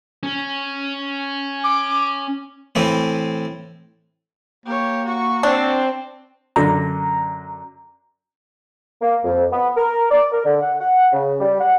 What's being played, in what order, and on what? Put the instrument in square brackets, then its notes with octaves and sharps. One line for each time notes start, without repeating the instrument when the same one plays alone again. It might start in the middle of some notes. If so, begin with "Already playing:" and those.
[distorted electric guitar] C#4
[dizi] D6
[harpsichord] A2 E3 C4 B4
[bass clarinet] A#3 [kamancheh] G4 C#5
[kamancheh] F#4 C#6
[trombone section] C4 [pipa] D4
[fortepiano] F#2 D3 D4 [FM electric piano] A#5
[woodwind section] A#3
F2
B3
A#4
D5
A#4
D3
F#5
F#5
C#3
G3
F#5